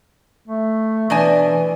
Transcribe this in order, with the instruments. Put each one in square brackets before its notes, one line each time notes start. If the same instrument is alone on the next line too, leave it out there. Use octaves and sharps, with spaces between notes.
[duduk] A3
[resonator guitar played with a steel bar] B2 D4 G#5 [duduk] E3